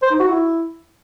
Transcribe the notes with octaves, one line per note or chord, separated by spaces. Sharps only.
C5
D#4
F#4
E4